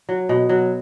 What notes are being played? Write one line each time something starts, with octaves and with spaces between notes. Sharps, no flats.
F#3
B2
F#3